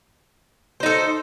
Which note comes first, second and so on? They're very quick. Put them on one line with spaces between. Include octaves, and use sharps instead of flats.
C5 D#4 A4